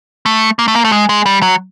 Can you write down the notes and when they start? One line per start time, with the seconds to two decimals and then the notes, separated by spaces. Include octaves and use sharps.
0.26 A3
0.59 A#3
0.68 A3
0.76 A#3
0.85 A3
0.92 G#3
1.09 G#3
1.26 G3
1.42 F#3